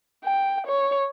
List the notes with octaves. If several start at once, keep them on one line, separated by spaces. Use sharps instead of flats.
G5
C#5